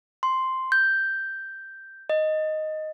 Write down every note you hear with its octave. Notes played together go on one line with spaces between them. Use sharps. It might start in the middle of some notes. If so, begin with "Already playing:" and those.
C6
G6
D#5